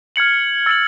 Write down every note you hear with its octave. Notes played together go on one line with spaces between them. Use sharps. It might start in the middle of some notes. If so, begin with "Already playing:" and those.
F6 G#6 C#7 F#7
E6 A6 C#7 F#7